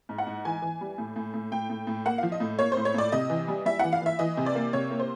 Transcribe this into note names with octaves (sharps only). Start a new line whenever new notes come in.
G#2
F#5
G#2
E3 G#5
E3
G3
A2
A2
A2
A2 G5
A2
A2
A#3 F#5
F3 F5
D#5
A2
A#3 C#5
A2 C5
C#5
A2 D5
C3 D#5
E3
G3
G3 E5
E3 F#5
F5
E3 E5
E3 D#5
C3
D5
A#3
C3 C#5
A#3
C5